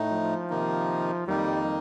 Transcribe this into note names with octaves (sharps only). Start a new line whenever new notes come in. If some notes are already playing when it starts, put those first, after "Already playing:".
Already playing: A2 A3 D#4
F3
C3 D#3 A#3 D#4
F2 D#3 G3 A#3 D#4